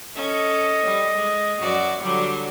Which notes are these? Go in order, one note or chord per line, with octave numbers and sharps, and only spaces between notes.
C#4 A4 D#5
G3
G#3
F#2 F#4 D5
D3 F#3 G3 D6